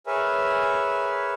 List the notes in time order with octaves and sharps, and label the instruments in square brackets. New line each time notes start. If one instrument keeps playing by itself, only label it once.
[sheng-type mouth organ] G#4 A#4 B4 C#5 E5 G#5